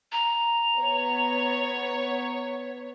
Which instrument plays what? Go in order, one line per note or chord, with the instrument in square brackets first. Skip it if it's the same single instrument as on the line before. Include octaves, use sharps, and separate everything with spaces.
[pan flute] A#5
[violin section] B3 C#5